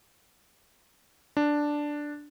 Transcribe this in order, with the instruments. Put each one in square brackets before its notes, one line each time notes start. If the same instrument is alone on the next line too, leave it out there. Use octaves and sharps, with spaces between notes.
[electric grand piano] D4